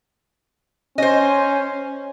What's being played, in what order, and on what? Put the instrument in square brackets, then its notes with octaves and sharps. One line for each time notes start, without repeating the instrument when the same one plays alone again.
[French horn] C#4 [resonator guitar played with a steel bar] C5 D#5